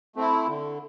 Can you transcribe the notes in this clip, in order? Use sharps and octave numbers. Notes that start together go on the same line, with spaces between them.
A3 C4 E4
D3